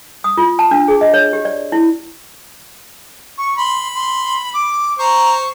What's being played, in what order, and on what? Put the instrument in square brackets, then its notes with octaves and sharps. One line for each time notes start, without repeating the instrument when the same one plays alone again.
[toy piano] D#6
F4
A5
D4
G#4
D#5
C#5
G4
D5
E4
[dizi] C#6
[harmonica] B5 [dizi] C6
[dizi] C6
D6
[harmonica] C5 C#6 [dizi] A#5